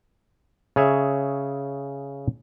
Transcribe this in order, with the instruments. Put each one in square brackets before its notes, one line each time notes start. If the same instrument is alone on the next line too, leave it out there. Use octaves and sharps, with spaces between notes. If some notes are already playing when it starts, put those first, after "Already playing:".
[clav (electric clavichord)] C#3 G#4 C#5 E5